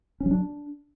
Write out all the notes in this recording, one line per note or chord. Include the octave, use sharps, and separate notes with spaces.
C#4
F#3
D4